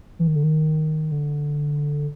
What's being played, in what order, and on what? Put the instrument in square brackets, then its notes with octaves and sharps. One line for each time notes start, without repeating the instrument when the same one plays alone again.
[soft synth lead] E3
D#3
D3
D#3
D3